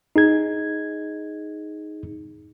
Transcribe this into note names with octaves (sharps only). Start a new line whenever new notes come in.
D#4 G#4 G#6